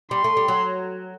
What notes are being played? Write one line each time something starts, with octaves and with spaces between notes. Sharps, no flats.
G3 C6
A3
G3
F#3